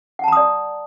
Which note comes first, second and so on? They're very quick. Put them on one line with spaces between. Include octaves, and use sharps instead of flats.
F#5 A5 A#5 D#6 D5